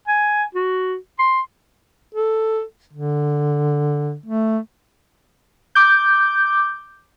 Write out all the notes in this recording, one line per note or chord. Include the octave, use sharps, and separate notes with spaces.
G#5
F#4
C6
A4
D3
A3
D6 G6